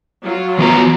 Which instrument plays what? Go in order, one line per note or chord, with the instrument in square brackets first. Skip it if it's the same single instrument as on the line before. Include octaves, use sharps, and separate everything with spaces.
[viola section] F#3 F4
[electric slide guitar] E3 B3 A#5